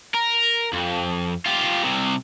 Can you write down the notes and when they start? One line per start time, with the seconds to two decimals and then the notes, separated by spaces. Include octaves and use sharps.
0.14 A#4
0.73 F2
1.46 F4 G4
1.83 C2 C3